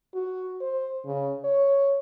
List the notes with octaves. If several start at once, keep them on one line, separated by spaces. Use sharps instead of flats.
F#4
C5
C#3
C#5